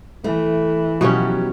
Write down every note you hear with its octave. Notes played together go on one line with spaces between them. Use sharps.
E3 A3
B2 F3 F#3 C#4 G4